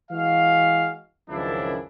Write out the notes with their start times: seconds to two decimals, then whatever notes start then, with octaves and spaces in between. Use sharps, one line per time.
0.11 E3 G#3 F#4 F5
1.30 C#2 F#2 D#3 F3 D4 E4